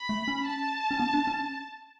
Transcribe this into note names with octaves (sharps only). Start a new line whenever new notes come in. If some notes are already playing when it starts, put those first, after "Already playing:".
Already playing: B5
A3
C#4
A5
C#4
B3
D4
C#4